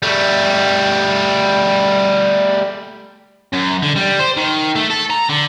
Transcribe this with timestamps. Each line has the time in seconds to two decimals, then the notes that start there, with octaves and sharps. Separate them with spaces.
0.03 G3 A3
3.53 F#2
3.83 D3
3.96 G3
4.19 C5
4.37 D#3
4.76 A3
4.91 A4
5.10 A#5
5.29 D3